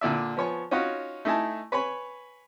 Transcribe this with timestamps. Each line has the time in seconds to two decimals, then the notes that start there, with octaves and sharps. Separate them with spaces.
0.01 A#2 D3 D5 E5
0.37 F3 B3 C#5 G#5 C#6
0.71 C#4 D#4 F4 F#4 C#5 F#5
1.25 A3 D#4 E4 G#5 A5
1.72 B4 C#5 G#5 B5